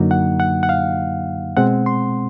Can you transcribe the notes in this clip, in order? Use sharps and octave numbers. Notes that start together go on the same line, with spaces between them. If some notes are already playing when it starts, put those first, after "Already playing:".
Already playing: F#2 D3 F#3 A#3 D#4
F#5
F#5
F#5
F5
B2 G#3 C4 F#5
C6